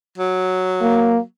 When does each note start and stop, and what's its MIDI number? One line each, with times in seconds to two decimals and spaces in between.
0.18 1.23 54
0.81 1.18 58